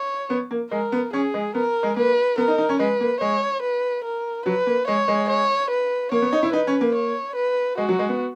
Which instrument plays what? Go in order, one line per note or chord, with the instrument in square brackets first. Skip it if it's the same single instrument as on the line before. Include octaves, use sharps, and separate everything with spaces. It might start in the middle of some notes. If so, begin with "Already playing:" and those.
Already playing: [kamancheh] C#5
[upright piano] B3
A#3
[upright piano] G#3 [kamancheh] A#4
[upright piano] B3
[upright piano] C#4 [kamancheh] G#4
[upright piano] G#3
[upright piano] B3 [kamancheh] A#4
[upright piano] G#3
[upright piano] A#3 [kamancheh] B4
[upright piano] B3 [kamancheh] A#4
[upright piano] D#4
D#4
C#4
[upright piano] G#3 [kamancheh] B4
[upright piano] A#3
[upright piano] G#3 [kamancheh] C#5
[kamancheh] B4
A#4
[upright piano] F#3 [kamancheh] B4
[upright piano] A#3
[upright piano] G#3 [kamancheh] C#5
[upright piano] G#3
[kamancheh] C#5
B4
[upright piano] A#3 [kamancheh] C#5
[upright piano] B3
D#4
E4
[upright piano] D#4 [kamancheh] B4
[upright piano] C#4
A#3
[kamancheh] C#5
B4
[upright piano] G#3 [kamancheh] F#4
[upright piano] F#3
G#3
B3